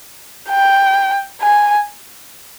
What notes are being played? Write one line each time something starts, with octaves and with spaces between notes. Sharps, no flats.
G5
G#5